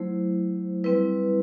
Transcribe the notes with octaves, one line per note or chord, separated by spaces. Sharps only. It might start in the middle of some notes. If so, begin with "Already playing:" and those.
Already playing: F#3 A3 E4 C5
G3 C4 E4 B4